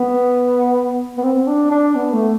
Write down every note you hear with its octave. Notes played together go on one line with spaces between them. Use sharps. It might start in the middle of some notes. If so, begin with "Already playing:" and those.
Already playing: B3
B3
C4
D4
D4
B3
A3